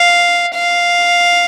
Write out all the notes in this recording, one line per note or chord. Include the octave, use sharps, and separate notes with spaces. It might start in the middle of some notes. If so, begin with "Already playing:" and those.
Already playing: F5
F5